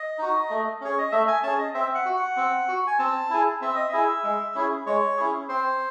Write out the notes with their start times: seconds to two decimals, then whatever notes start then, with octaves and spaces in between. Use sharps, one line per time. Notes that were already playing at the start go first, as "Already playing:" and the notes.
Already playing: D#5
0.18 D#4 F#4
0.50 A3
0.81 C#4 G#4 C#5
0.99 D#5
1.12 A3 E5
1.28 G#5
1.43 C#4 G#4 A5
1.59 D#5
1.74 C4 E5
1.95 F#5
2.05 F#4
2.16 F#5
2.37 C4
2.68 F#4
2.87 G#5
2.99 C4 A5
3.30 E4 G#4
3.61 C4 E5
3.75 D#5
3.89 E4 G#4 E5
4.24 G#3
4.55 C#4 E4 G#4
4.86 G#3 C#5
5.17 C#4 E4 G#4
5.48 C4 C5